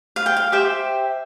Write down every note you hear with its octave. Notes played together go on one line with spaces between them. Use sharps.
F5
G5
F5
G4 C5 E5 G5